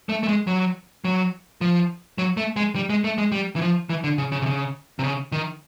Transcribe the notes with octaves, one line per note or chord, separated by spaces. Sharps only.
A3
A3
G#3
F#3
F#3
F3
F#3
A3
G#3
G3
G#3
A3
G#3
G3
E3
F3
E3
D3
C#3
C#3
C3
C#3
C3
C#3
D#3